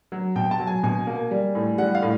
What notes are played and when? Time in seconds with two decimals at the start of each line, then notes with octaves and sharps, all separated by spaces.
0.12 F#3
0.36 B2 G5
0.51 A5
0.60 F#3
0.67 G#5
0.83 B2 G#5
1.07 A#3
1.31 G3
1.55 A2
1.78 G3 F#5
1.95 F5
2.02 A2